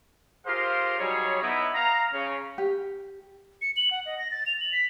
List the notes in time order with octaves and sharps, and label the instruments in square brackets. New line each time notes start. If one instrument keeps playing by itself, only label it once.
[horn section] F4 G4 G#4 A#4 C5 F5
F#3 G3 D#4 G#4 C#5
B3 D#4 E4
F5 A#5
C#3 C#4
[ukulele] G4
[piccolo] C#7
F#7
F#5
D#5
A#6
A6
F7
F#7
B6